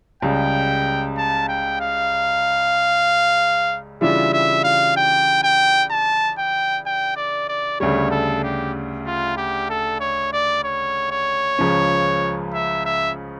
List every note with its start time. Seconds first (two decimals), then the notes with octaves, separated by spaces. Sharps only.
0.22 C#2 C#3 G3 G5
1.18 A5
1.49 G5
1.81 F5
4.01 C#3 E3 G3 D4 F4 E5
4.33 E5
4.64 F5
4.97 G5
5.43 G5
5.91 A5
6.38 G5
6.86 G5
7.16 D5
7.49 D5
7.80 D2 C#3 G3 C#5
8.11 A4
8.44 G4
9.06 F4
9.37 G4
9.70 A4
10.00 C#5
10.33 D5
10.64 C#5
11.11 C#5
11.59 C#2 C#3 F3 C#4
12.54 E5
12.86 E5